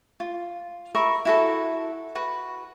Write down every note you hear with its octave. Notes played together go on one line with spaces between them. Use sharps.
F4
A#4 E5 B5 C#6
E4 F#4 A4
F#4 B4